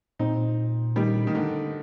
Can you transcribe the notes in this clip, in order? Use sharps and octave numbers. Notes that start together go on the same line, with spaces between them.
A#2 C4 D#4
D#3 G3
D#3
D3